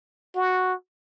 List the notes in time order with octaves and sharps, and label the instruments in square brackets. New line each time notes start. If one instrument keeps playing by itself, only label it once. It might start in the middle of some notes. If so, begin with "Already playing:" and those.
[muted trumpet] F#4